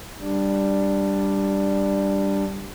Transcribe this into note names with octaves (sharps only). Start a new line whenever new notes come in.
G3 D4